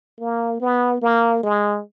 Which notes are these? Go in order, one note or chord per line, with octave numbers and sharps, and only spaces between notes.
A#3
B3
A#3
G#3